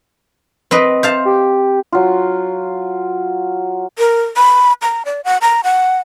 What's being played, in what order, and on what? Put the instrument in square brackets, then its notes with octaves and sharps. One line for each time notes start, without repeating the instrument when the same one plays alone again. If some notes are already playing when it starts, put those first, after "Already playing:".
[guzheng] C4 B4 D#5
C5 F5 A5
[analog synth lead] G4
[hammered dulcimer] F#3 F4
[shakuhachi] A#4
B5
A#5
D5
F#5
A#5
F#5